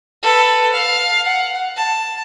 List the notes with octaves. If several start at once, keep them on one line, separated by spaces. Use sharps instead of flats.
A4 B4
F5
F#5
A5